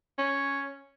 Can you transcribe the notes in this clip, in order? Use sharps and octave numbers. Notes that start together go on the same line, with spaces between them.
C#4